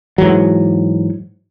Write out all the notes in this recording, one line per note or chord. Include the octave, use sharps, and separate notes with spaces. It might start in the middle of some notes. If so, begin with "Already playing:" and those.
G#2 E3 F#3